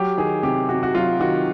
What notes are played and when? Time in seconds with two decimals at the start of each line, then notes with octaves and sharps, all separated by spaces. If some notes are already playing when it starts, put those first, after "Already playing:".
Already playing: F#3 G4
0.17 D#3 G#4
0.43 C3 G4
0.69 C3 F#4
0.83 F#4
0.94 F#3 F4
1.20 D#3 F#4